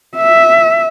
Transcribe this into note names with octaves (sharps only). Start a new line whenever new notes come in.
E5